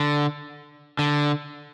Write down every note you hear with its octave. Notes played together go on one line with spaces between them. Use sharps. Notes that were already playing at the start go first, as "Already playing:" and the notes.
Already playing: D3
D3